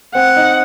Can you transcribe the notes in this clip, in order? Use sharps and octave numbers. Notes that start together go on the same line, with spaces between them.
C4 F#5
D#4